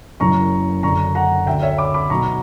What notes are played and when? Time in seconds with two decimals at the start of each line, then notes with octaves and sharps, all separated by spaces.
0.20 F#1 F#2 C#3 E3 A#5 C#6
0.83 F#1 F#2 D3 A#5 C#6
1.15 F#5 A#5
1.46 D2 E5 G5
1.50 D3
1.62 C#5 E5
1.78 B5 D6
1.94 B5 D6
2.10 B1 B2 A#5 C#6